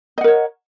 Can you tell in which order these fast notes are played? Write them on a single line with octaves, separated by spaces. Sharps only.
D#5 F#5 A#4 C#5